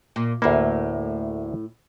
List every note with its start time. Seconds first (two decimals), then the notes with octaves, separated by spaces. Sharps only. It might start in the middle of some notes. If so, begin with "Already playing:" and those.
0.16 A#2
0.42 D2 A2 A#3 E4